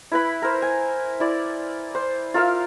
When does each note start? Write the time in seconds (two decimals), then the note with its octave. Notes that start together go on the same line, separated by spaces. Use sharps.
0.12 E4 B4 B5
0.42 A#4 C5
0.62 G#5
1.20 E4 D5
1.95 C5
2.34 F4 A#4 E5 F5